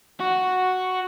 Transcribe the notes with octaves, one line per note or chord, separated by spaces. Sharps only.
F#4